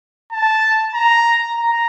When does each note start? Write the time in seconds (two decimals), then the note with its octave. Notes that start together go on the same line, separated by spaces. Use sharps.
0.32 A5
0.95 A#5
1.58 A#5